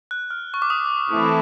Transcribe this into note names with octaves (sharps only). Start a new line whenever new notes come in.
F#6
F6
C#6
D6
D#6
E3 A3 C4 E4 A4